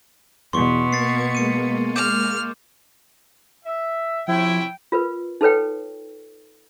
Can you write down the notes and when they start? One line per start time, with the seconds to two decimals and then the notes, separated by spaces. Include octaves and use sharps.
0.53 E2 B2 C6 C#6
0.93 A#3 B3 G#6 A6 C7 C#7
1.35 G#3 A#3 C#7 D#7
1.96 D6 F6 G6 E7
3.65 E5
4.28 C3 F3 C#4 E4 G5
4.92 F4 A#4 B4
5.41 D#4 A4 B4 C#5 G5